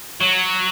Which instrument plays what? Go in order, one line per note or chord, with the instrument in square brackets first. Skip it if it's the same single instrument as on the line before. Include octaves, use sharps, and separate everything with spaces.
[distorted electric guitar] F#3